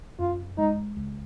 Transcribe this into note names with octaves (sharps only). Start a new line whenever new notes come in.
F#2 F4
G#3 D#4
C#2